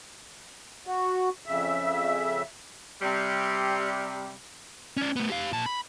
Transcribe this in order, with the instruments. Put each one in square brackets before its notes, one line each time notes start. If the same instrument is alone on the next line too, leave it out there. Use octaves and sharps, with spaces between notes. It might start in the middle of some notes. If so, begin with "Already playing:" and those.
[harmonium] F#4
[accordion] F2 C#3 E5
[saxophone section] C3 G3
[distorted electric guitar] C#4 D5
A3 B3
G4 F5
A#2 A5
B5